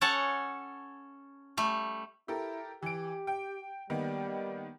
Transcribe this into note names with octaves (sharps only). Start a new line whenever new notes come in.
C#4 A4 C#5 F#5 A5
G3 A3
E4 G4 A4 A#4
E3 G4 D7
G5
D#3 G3 A#3 B3